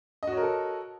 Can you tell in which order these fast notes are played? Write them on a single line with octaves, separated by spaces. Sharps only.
D#5 F#4 C#5 A#4 A4